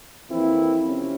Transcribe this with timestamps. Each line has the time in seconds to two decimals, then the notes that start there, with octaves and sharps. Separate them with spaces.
0.30 F2 E3 A#3 C4 E4
0.85 C3 F3 C#4